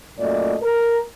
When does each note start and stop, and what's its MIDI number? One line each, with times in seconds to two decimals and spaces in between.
0.19 0.55 42
0.19 0.55 46
0.19 0.55 57
0.19 0.55 74
0.19 0.55 75
0.62 1.00 70